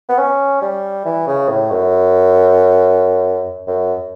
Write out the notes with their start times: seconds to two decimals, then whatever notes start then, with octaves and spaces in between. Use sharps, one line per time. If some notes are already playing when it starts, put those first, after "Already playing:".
0.09 B3
0.18 C#4
0.62 G3
1.05 E3
1.27 C#3
1.49 A2
1.71 F#2
3.67 F#2